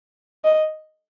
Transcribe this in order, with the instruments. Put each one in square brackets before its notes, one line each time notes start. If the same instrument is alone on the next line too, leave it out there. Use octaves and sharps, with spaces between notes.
[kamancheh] D#5